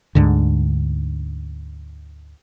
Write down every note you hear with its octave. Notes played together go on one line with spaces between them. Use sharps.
D2 G#2 D3